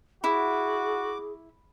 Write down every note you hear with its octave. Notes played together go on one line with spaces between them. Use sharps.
E4 F#4 G#4 D6